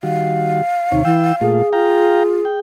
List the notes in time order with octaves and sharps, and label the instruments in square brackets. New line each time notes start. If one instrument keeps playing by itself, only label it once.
[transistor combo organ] D#3 G3 F#4 [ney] F5
[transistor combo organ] D#2 C3 C#5 [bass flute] D#4
[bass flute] E3 [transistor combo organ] G5 E6
[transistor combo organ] A#2 A3 F4 [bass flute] G#4
[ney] F4 [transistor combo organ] F5 G5 A#5
[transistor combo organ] G5